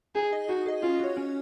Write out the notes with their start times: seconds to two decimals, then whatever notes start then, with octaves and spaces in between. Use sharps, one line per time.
0.15 D#4 G#4
0.32 G#4 D#5
0.49 D#4 F#4
0.66 G#4 D#5
0.82 C#4 F4
0.99 F#4 C#5
1.17 C#4